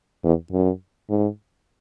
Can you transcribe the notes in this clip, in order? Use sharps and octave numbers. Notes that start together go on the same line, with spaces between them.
E2
F#2
G#2